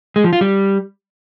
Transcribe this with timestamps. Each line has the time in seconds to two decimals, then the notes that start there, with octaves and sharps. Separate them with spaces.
0.16 G#3
0.24 F3
0.33 F4
0.41 G3